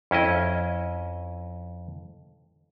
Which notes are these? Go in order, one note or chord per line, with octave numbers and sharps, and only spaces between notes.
F2 C#4 E4 D#5